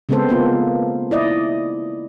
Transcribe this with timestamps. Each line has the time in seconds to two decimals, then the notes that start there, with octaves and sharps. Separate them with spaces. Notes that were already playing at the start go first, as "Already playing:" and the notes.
0.09 C#3 G#3 B3 C4 A4 C5
0.29 A#3 B3 F4
1.11 E4 D5 D#5